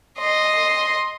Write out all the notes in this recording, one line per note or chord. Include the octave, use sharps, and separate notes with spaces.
D#5 C6